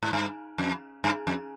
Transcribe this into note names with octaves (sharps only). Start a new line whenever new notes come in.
G#2
G2
F2
G2
F2